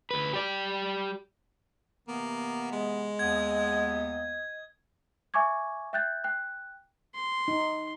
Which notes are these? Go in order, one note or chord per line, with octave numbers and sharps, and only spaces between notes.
D2 B4
G4 D5
C3 E3 A#3 B3
G#3 D#5
D#2 B3 G#6
E5 G#5 C#6 D6 G#6
E5 G5 F#6 G6 A6
G5 F#6
C6
D#4